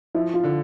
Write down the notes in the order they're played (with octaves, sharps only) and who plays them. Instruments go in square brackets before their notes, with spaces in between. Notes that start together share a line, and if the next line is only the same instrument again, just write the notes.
[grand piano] F3 [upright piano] E4
[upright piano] F4
[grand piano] D3